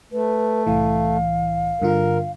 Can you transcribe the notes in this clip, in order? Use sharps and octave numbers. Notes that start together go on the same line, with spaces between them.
A3 B4
C2 A2 E3 F5
G2 D3 F4 A#4